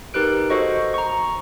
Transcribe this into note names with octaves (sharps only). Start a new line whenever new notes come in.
D#4 G4 A#4 B4 F#6 D7
F#4 A4 C5 D#5 C#6
A#5 C#6